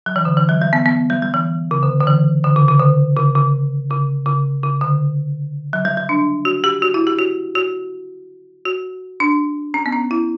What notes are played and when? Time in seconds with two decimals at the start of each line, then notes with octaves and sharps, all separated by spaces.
0.06 F#3
0.16 E3
0.25 D3
0.37 E3
0.49 F#3
0.62 G3
0.73 B3
0.86 B3
1.10 G3
1.22 G3
1.34 E3
1.71 C#3
1.83 D3
2.00 D3
2.07 E3
2.44 D3
2.56 C#3
2.68 C#3
2.80 D3
3.17 C#3
3.35 C#3
3.90 C#3
4.26 C#3
4.63 C#3
4.81 D3
5.73 F#3
5.85 G3
5.97 G3
6.09 D4
6.45 F#4
6.64 G4
6.82 F#4
6.94 E4
7.07 G4
7.19 F#4
7.55 F#4
8.65 F#4
9.20 D4
9.74 C#4
9.86 B3
9.92 C#4
10.11 E4